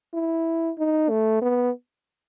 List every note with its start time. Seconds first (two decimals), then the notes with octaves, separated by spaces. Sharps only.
0.14 E4
0.78 D#4
1.09 A3
1.42 B3